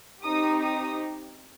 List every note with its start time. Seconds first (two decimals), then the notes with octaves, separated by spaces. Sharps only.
0.23 C4 D#4 G4 D#6
0.61 D#6